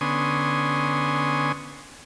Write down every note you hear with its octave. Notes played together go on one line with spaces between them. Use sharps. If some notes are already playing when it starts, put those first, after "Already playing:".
D3 B3 C#4 G#5 C6 D#6